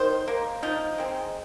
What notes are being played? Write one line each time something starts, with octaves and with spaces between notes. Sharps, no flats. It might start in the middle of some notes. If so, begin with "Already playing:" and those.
Already playing: D#3 C5
A#3
F3 D#4
G#3 C4